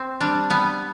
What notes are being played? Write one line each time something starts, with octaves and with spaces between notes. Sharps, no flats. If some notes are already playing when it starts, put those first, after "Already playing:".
Already playing: C4
G3 D4
G3 B3